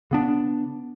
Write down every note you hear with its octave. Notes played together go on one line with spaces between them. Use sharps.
C#3 B3 D4